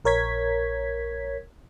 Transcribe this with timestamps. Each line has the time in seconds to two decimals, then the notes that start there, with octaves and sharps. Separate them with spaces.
0.05 A#1 A#4 C#5 G#6 B6